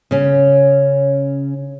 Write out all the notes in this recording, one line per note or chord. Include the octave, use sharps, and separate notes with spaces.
C#3 C#4